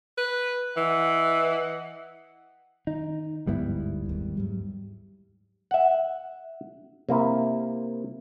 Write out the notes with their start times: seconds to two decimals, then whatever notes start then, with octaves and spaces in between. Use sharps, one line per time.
0.18 B4
0.77 E3 D#5 F#5
2.87 D#3 D#4
3.47 G1 D2 G#2 G3 B3 E4
4.09 D#2 G#2 D#3
4.37 G#2 F#3 G3
5.71 E5 F#5
7.09 C3 A#3 E4